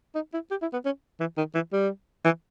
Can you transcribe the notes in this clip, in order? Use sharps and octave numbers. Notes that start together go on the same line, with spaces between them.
D#4
E4
G4
E4
B3
C#4
E3
D#3
E3
G3
E3